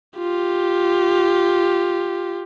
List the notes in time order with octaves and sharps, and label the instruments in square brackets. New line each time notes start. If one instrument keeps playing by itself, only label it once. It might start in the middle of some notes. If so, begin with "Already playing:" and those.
[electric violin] F4 G4